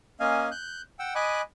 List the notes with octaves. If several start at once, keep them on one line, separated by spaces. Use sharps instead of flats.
A#3 C#4 D#5 F5 G#5
F#6 G6
F#5 G5 E6
D#5 G#5 B5 D6 F#6